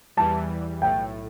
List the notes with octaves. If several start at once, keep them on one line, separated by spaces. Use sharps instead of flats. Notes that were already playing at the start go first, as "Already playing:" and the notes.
E2 E3 G3 A5
B1 A2 A3 G5